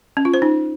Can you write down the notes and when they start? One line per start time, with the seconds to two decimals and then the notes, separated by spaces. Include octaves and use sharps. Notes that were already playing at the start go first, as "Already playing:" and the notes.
0.17 C#4
0.25 F4
0.34 C5
0.42 D#4